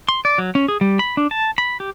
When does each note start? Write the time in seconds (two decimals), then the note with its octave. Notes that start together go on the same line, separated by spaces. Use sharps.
0.09 C6
0.25 D5
0.38 F#3
0.55 C#4
0.68 G#4
0.81 G3
0.99 B5
1.17 D4
1.31 A5
1.58 B5
1.80 G4